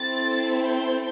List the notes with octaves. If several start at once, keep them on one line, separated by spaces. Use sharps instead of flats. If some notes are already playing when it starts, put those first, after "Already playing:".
Already playing: C4 E4 A4 A6
G6